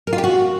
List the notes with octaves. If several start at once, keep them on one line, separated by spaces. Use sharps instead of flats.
A#4
F4
G4
F#4